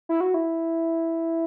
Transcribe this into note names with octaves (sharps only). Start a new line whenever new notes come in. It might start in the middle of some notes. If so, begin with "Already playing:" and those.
E4
F#4
E4